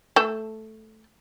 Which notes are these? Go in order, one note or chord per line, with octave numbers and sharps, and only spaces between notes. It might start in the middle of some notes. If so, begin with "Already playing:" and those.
A3 A4